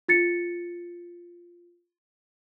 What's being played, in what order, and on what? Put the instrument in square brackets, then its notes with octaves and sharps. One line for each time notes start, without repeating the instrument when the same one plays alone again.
[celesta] F4 A6 C#7